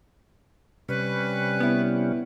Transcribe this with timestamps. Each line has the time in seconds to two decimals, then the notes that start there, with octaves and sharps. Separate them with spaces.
0.89 C3 G3 C#4 B4
1.60 B3 E4